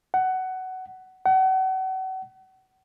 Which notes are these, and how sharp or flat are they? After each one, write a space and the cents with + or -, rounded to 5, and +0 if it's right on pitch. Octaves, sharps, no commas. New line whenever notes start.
F#5 +15
F#5 +35